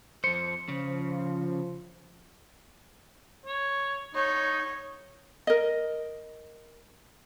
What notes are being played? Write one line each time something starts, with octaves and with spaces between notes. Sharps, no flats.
F2 C5 C#7
C#3 F3
C#5
D#4 C#5
A#4 D#5